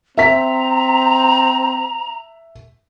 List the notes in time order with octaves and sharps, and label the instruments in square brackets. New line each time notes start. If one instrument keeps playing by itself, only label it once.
[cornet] C4 [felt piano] E5 B6 [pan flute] A#5